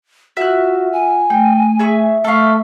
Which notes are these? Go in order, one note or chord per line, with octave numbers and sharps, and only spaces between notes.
F4 F#4 E5 F#5 F#6
G#5
A3 G5
G#4 E5 C#6
A3 A4 E5 F5 C#6